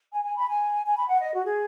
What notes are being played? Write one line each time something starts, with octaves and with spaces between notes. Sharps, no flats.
G#5
G#5
B5
G#5
G#5
B5
F#5
D#5
F#4
G#4